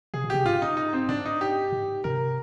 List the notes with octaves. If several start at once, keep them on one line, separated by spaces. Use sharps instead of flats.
C3 G#4
A#2
C3 G4
G#2 F4
D#4
D#4
C4
G#2 D4
D#4
G4
G#2
C3 A#4